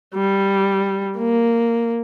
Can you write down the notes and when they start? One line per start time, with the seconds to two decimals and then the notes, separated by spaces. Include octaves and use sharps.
0.15 G3
1.17 A#3